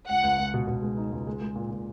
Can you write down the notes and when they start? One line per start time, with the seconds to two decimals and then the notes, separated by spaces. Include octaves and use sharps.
0.09 C#2 F#5
0.23 C#2
0.38 C#2
0.54 B2
0.67 B2
0.82 G#3
0.97 D#4
1.12 C#2
1.27 G#3
1.42 G#3
1.56 A#2
1.71 A#2